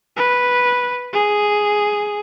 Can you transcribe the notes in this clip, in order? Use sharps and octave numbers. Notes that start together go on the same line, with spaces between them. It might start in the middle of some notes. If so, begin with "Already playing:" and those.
B4
G#4